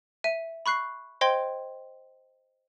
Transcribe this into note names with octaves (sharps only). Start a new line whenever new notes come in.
E5 D#7
B5 C#6 F#6 C7
C5 D#5 G5 C6 G#6 G7